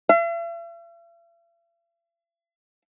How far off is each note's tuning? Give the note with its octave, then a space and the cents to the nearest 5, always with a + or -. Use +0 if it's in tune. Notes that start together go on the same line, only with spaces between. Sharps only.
E5 +45